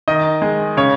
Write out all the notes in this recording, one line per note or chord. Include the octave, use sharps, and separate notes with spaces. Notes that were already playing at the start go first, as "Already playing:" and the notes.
D#3 D#5
G#3
C#3 C#5